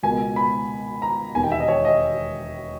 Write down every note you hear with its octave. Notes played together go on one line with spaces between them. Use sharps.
C#2 B2 A#3 G#5
B5
A#5
E1 D#2 D#3 G#5
G5
E5
D#5
C#5
D#5